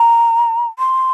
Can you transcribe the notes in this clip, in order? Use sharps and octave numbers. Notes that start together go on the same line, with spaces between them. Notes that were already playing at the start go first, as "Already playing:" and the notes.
Already playing: A#5
C6